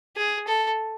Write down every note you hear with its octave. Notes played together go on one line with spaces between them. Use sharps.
G#4
A4